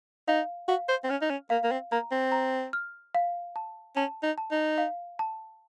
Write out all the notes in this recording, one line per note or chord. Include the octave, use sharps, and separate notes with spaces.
D#4 F5
F#4 F5
C5
C4
C#4 F6
D#4
C#4
A#3 F5
A#3
C4
A#3 A#5
C4
A#5
F6
F5
A5
C#4 A5
D#4
A5
D#4
F5
A5